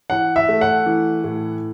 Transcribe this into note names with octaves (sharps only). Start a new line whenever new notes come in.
E3 F#5
E5
A3
F#5
E3
A2